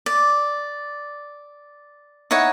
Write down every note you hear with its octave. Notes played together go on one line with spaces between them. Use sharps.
D5
D#4 E4 C#5 F#5